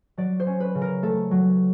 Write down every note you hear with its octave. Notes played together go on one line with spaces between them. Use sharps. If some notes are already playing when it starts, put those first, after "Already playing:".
F#3 D5
C5
C#4
B4
C#3
A#4
A3 A4
F#3